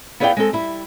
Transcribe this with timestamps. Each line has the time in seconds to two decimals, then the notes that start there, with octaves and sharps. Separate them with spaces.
0.20 B3 E4 G#4 D5 F5 G5
0.37 G#3 C4 A4
0.53 G3 E4